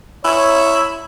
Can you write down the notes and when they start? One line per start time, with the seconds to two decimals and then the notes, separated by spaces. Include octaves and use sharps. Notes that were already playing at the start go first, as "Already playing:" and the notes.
0.24 E4 C#5